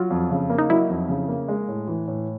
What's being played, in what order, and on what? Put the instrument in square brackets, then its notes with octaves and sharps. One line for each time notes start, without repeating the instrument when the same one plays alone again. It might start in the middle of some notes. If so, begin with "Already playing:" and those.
Already playing: [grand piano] F#3 [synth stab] F4
[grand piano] F2
C#3
A#3
[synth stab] D#4
[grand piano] F#3 [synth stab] E4
[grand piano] F2
C#3
A#3
G#3
A2
E3
A2